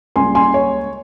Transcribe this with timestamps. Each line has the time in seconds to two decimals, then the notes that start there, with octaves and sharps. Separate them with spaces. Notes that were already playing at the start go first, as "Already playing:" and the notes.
0.16 C#2 C#3 G3 A#3 G#5 C6
0.35 G#5 C6
0.54 C#5